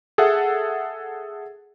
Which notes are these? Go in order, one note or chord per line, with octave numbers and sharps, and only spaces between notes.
G#4 A4 E5 F#5